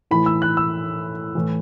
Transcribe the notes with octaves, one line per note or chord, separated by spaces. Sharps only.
A2 E3 B5
E6
F#6
E6
A2 E3